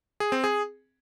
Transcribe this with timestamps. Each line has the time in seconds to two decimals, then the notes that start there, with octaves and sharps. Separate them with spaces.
0.20 G#4
0.32 C4
0.44 G#4